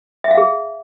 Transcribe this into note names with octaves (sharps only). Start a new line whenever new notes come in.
E5
F5
G#4